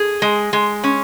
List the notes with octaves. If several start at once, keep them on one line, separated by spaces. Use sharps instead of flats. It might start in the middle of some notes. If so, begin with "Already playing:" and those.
Already playing: G#4
G#3
G#3
C#4